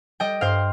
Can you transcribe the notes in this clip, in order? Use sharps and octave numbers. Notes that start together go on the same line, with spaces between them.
G3 D#5 G5
G2 C5 F5